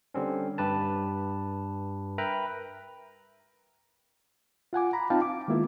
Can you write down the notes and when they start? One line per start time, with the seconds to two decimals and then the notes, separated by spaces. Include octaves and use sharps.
0.14 D3 G3 C4 C#4
0.58 G2 G4 B4 A5
2.18 A#4 B4 E5 G5 A#5 B5
4.73 F4 F#5 G#5 D6
4.93 A#5 B5
5.10 C4 D#4 F4 F5 G5 A5
5.22 D6
5.48 D#3 G#3 A#3 B3 E4 F4